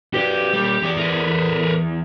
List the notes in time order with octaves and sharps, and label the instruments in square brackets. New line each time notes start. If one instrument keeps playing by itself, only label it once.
[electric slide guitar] F#4 B4 D5 [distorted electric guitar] G4
[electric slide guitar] G3 A#3
E2 G#4 D5
[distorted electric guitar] A#4 B4